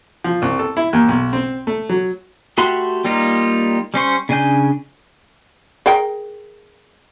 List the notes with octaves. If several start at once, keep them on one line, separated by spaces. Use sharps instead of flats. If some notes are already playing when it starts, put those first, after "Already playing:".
F3
C2
A4
E4
D#2
B1
C4
A3
F#3
A3 F#4 G4 B5 C6
G3 A#3 D#4 F4 G4
G3 C#4 C5 C#6
C#3 D4 G#5 G6
G#4 A#4 G5